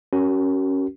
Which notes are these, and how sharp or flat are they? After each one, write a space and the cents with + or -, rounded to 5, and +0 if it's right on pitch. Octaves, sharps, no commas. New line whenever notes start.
C#4 +0 F#4 +35 A#4 +0